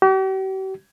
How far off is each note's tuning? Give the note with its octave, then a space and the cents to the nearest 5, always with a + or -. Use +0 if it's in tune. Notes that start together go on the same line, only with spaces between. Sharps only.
G4 -45